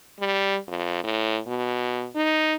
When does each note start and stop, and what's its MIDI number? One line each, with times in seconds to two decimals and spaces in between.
0.20 0.57 55
0.68 1.00 41
1.04 1.40 45
1.47 2.07 47
2.15 2.56 63